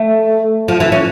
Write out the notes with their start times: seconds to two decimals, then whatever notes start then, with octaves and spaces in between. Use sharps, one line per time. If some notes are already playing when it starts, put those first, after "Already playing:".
Already playing: A3
0.68 F3
0.80 E3
0.92 C#4